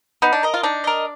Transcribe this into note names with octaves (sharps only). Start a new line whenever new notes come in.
B3 D#4
D4
A#4 D#5
F4
D4 D#4
A#4 D#5